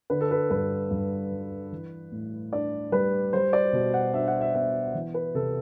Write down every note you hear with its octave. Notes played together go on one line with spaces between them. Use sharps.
D3 B4
A4
B4
G2 B4
G2
G3
E3
A2
D4 D5
G3 B4
G3 C5
D5
B2
F#5
D4 E5
F#5
E5
B3 E5
E3
B4
C3 A4